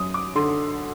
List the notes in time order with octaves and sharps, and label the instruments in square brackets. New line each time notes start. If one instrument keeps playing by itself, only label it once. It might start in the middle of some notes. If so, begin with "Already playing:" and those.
Already playing: [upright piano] F#2 D#6
D6
D3 C6